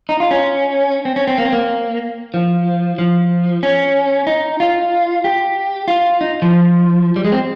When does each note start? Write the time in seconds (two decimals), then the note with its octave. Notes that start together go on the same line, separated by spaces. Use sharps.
0.09 D#4
0.20 F4
0.31 C#4
1.05 C4
1.16 C#4
1.27 C4
1.38 A#3
1.45 C4
1.53 A#3
2.34 F3
2.99 F3
3.63 C#4
4.27 D#4
4.60 F4
5.24 G4
5.88 F4
6.21 D#4
6.42 F3
7.16 G3
7.25 G#3
7.32 C4